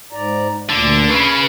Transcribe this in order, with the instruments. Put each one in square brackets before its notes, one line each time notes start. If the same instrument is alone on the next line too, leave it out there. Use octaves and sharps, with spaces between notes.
[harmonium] G#2 D5 A#5
[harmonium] D2 A#2 [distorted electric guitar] D3
[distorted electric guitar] C#3 [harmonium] B4